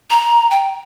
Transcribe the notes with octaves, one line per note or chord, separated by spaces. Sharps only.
A#5
G5